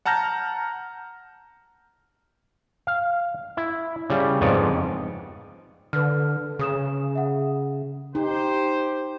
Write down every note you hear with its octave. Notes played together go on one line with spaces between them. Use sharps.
F#5 A5 A#5 F6 G6 A#6
F5
E4
C#3 G3
F2 G#2 B3 C#5 D5 G#5
D3 B4 F6
C#3 G#4 D#6 E7
E5 F#5
D#4 G4 C5